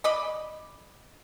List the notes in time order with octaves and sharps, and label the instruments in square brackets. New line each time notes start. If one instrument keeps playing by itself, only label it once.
[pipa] D5 D#5 B5